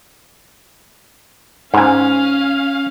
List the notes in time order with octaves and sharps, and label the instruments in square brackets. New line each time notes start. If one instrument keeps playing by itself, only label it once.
[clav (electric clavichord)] G#2 G#5 [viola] C#4 F5